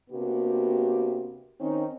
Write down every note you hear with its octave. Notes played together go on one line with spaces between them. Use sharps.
C3 A#3 B3 D4 F#4 G4
D#3 C4 C#4 D#4